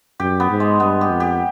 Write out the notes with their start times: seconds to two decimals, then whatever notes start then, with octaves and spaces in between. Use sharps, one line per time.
0.20 F#2 G4
0.40 B3
0.50 G#2
0.60 G#3
0.80 G2 B3
1.01 G4
1.10 F2
1.20 G4